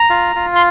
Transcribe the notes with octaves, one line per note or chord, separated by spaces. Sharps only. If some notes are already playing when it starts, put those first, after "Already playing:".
Already playing: A#5
F4
F4
C6